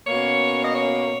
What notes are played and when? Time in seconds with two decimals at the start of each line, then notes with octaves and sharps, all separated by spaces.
0.06 B2 A#3 C#4 C#5
0.64 D#5
0.75 C#5